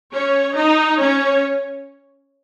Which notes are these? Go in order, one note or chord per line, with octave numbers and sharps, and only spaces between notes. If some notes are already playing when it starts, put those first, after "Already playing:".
C#4 C#5
D#4 D#5
C#4 C#5